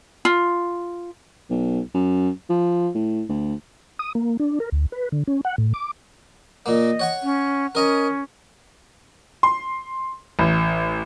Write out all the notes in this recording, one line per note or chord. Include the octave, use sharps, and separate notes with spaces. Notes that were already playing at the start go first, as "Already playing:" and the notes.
F4
B1
F#2
F3
A2
D2
D#6
A#3
D4
A#4
D2
B4
D3
C#4
F#5
A2
D6
A#2 A#3 D#5
C#5 F#5 C#6
C#4
C#4 A#4 D#5 A#5
C6
A1